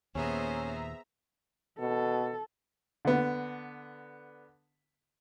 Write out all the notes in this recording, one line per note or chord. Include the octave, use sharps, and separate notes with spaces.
D#2 A#2 B3 C#4 G#4 C5 E5 A#5
B2 A4
D3 B3